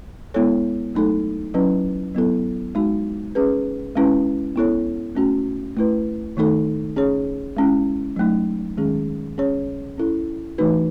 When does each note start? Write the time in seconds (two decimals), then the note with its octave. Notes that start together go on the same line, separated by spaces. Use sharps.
0.34 G#3 B3 E4 A4 C#5
0.94 F#3 A3 D#4 A4
1.54 F#3 C#4 E4 B4
2.15 F#3 B3 E4 A4
2.75 G#3 D#4 F#4
3.35 C#4 G#4 B4
3.96 G#3 C#4 E4 B4
4.56 B3 E4 A4 C#5
5.15 A3 C#4 F#4
5.77 A3 E4 B4
6.37 D#3 A3 D#4 A4
6.96 C#4 G#4 C#5
7.57 G#3 C#4 E4
8.16 F#3 A3 D#4
8.77 D#3 G#3 C#4 G#4
9.38 C#4 G#4 C#5
9.98 C#4 E4 A4
10.58 E3 A3 D#4 F#4 B4